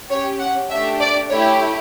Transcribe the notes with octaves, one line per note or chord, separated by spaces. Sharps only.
C#4 G4 C#5
F#5
A3 D4 G4 E5
D5
A3 E4 G4 C#5